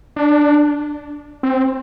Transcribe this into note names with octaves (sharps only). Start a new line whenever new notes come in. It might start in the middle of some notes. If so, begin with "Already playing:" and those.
D4
C4